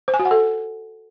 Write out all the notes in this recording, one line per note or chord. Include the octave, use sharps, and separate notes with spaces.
C5
G#5
F#4
F#5
A4